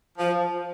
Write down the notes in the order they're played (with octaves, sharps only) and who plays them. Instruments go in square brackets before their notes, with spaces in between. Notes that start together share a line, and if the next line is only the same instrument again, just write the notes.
[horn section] F3